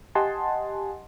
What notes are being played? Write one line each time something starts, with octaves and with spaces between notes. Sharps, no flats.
G4 D#5 F#5 G#5 A5 C6